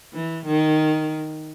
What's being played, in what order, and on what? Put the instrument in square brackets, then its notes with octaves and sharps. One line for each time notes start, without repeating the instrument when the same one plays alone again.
[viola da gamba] E3
D#3